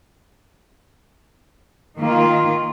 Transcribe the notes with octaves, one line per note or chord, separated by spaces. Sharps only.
D#3 A#3 F4